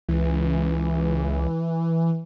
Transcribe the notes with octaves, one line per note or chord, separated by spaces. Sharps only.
C#2 E3